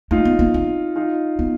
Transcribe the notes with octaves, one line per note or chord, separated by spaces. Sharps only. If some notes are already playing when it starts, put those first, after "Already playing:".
A3 D#4 F4
B3
A#3
C4
D#4 F4
B3